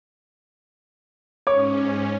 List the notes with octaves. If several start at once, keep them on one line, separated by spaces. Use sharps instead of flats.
G#2 C#4 C#5 D6